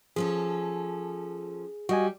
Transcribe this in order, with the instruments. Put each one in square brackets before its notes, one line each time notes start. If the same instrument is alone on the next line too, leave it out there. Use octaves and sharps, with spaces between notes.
[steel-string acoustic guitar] F3 C#4 A4 [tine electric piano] G#4
[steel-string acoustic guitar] G3 [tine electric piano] F#4 D#5 G#5